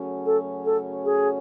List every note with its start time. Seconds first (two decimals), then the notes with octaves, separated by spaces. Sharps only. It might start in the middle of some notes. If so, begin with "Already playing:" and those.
Already playing: F#2 C#3 F#3 A3 C#4
0.25 A4
0.65 A4
1.05 G#4